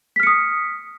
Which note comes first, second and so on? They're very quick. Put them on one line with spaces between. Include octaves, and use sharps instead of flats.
B6 F6 C#7 D#6